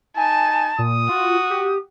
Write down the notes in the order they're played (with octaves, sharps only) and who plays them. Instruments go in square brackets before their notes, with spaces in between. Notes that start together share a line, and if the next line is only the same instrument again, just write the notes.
[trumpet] D#4 [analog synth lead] G#5 [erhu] A5
[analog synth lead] A#2 [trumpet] D#6
[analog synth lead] F4 [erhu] F#4
[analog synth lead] G4